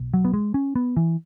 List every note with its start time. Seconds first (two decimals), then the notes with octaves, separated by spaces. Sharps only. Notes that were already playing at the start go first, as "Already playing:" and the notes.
Already playing: B1 B2
0.14 F#3
0.25 B3
0.34 G#3
0.54 C#4
0.76 B3
0.97 E3